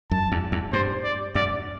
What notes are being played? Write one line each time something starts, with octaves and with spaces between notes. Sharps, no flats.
F#2 A5
E2
E2
G2 C5
D5
F#2 D5